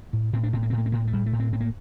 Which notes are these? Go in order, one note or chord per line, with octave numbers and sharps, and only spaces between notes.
A2
A2 C4
D4
A2 C4
A#3
C4
A2
A#3
C4
A2 A#3
A3
A2 G3
A3
A2
C4
A2 C4
A#3